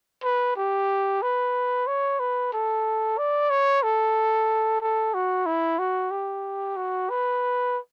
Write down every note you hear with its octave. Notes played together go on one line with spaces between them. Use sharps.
B4
G4
B4
C#5
B4
A4
D5
C#5
A4
A4
F#4
E4
F#4
G4
F#4
B4